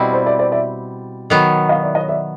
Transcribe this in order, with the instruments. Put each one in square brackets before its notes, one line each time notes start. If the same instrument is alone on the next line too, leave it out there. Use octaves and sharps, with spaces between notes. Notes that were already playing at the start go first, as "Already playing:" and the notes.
Already playing: [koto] B2 G3 C4 E4
[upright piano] C5 D5
D5 E5
C5 D5
D5 E5
[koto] D#3 F#3 B3
[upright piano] D#5 F5
D5 E5
C#5 D#5
D5 E5